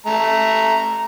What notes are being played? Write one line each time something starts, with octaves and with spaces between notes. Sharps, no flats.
A3 A#5